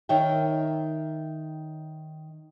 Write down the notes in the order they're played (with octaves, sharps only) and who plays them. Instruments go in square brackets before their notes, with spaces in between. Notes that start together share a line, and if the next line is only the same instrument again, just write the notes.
[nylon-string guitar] D#3 C#5 E5 G5